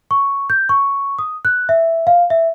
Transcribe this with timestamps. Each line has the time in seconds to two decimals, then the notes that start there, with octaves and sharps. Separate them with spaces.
0.11 C#6
0.50 G6
0.69 C#6
1.19 D#6
1.45 F#6
1.69 E5
2.07 F5
2.30 E5